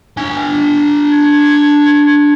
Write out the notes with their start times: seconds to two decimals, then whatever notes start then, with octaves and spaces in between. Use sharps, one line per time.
0.17 D4 G#5
1.13 G#6